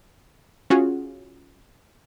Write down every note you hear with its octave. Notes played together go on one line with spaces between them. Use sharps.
C#4 F4 F#4 G#4